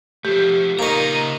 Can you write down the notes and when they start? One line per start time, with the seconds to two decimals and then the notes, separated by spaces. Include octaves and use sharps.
0.25 F3 A3 G4
0.79 A#2 C#3 D#4 D#5 A#5 C#6